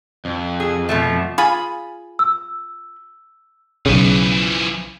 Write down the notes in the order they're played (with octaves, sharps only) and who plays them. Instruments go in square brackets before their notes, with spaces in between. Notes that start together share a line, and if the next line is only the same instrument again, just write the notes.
[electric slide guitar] F2
[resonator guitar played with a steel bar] G#4
B2 F3 A3
[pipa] F4 G#4 B5
[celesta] E6
[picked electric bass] B1 C#3 [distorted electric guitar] E3 F3